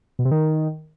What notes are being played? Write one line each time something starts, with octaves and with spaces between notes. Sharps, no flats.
B2
C3
D#3